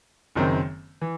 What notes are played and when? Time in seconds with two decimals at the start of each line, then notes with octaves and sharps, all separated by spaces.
0.35 F#1 F#2 D#3 F#3 C4
1.02 E3